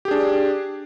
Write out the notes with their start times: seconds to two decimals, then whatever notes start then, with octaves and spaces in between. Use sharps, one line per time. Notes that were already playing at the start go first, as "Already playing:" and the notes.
0.05 G4
0.08 G#4
0.11 D4